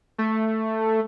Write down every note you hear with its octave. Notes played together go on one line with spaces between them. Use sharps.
A3